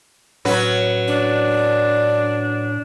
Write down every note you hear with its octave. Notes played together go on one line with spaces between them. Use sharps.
A2 F#3 C#4 B4
D4